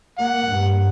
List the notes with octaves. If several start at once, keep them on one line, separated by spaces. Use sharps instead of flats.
A#3 F#5
G2